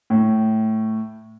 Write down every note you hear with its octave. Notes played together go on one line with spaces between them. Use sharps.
A2